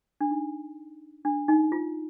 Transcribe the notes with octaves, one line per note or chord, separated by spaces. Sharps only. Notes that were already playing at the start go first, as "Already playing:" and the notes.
D4
D#4
D4
D#4
F4